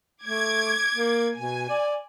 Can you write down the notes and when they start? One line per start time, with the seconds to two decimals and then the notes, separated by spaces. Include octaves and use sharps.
0.24 A3 D6 G#6
0.95 A#3
1.37 B2 G#5
1.69 D5